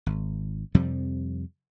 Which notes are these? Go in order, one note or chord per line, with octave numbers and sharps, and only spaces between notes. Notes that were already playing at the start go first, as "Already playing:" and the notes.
G#1
F2 C3 F3 G3